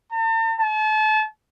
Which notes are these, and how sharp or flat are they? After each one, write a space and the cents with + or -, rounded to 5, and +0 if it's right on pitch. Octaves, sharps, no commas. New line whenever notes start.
A5 +45
A5 -35